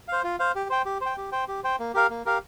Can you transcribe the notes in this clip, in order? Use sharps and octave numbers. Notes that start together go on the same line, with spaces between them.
C5 F5
F4
C5 F5
G4
C5 G5
G4
C5 G5
G4
C5 G5
G4
C5 G5
A#3
G4 A#4 F5
A#3
G4 A#4 F5